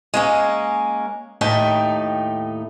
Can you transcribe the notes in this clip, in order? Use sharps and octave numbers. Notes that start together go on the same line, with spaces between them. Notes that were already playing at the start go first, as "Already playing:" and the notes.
G#3 A#3 C#4
D#2 A2 A3 D#4 G5 A5